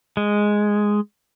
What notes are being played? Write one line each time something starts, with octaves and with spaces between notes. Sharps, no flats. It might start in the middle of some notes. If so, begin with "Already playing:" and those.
G#3